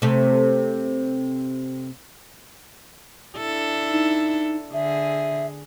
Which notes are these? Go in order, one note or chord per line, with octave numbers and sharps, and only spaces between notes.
C3 A3
D4 E4 A4
D#4
D3 G#4 E5